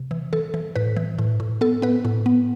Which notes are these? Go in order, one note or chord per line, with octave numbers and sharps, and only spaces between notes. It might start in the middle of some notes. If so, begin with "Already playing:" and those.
Already playing: C3
E3
E3 A4
E3
A2 B4
E3
A2
A2
B3 A4
B3 B4
A2
B3